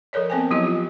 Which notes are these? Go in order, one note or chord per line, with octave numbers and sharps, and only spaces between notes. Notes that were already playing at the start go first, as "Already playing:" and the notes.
F3 A4 A#4 C#5 D5
B3 C4 A4 C5 G5 G#5
F3 F#3 B3 E4 G4 D#5
F4 G4